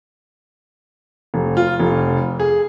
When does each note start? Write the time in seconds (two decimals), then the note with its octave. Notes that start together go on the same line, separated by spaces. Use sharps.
1.34 F1
1.57 F4
1.79 F1
2.40 G#4